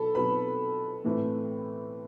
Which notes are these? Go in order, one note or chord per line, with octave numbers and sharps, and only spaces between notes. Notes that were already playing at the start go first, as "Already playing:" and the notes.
Already playing: B2 F#3 A4 A5 B5
B2 F#3 C4 B4 B5
A2 E3 A3 C4